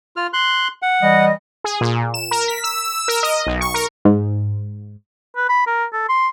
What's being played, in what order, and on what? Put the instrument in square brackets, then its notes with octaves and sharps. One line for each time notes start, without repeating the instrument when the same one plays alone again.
[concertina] F4 F6
C6 F#6
F#5
[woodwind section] E3 G3 D#5
[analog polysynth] G#4
A#2
E7
A#4
B6
E6
E6
A#4
D#5
B1
C#6
A#4
[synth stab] G#2
[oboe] B4
B5
A#4
A4
C6